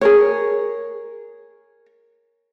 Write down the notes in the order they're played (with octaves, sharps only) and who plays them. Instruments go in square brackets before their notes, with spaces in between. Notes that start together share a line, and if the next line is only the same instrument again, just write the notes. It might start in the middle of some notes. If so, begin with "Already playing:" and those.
[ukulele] G#4 A#4 C#5